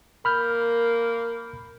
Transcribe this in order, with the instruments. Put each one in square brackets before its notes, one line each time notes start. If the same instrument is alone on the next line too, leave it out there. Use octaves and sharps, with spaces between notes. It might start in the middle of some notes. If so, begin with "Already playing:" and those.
[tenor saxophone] A#3 [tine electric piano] B5 F6 G6